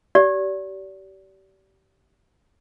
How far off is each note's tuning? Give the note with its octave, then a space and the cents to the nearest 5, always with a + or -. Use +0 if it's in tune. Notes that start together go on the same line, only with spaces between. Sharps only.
G4 -30 D5 -35